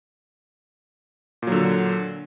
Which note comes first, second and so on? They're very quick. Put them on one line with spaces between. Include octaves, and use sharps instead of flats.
A#2 F#3 D3